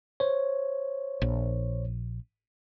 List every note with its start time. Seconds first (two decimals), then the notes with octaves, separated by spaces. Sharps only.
0.20 C5 C#5
1.22 A#1